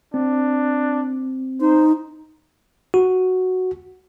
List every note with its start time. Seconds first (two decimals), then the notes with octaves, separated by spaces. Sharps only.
0.14 C4 D4
1.61 D#4 C5
2.94 F#4